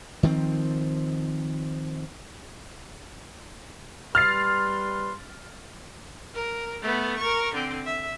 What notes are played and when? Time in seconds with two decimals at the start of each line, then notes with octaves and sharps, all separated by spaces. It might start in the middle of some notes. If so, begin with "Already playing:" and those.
0.23 D#3 F3 G#3 C4
4.15 G3 B4 C6 F6 A6 C7
6.34 A#4
6.82 A3 B3
7.18 A#4 C#6
7.54 D3 C4
7.85 E5